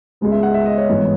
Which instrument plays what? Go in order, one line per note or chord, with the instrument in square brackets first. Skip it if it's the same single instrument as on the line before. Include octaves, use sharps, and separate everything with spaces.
[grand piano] C#2 C#3 G#3 B3
E5
F#5
E5
D#5
C#5
G#1 G#2 E3 B3